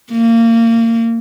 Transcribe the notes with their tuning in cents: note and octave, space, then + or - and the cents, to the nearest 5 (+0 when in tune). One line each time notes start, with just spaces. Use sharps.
A#3 -25